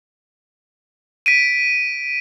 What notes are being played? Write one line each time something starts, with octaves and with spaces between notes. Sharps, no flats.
B6 D7 D#7